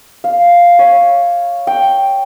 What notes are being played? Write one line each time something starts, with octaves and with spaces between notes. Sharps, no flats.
F5
C#5
G5